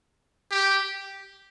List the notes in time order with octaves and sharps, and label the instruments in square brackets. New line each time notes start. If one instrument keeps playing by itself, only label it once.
[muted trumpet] G4